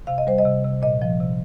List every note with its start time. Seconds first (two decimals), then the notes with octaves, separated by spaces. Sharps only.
0.07 C3 F5
0.18 D#5
0.27 G3 C5
0.38 D#5
0.45 C3
0.64 C3
0.82 A#2 D#5
1.02 F3 D#5
1.20 C3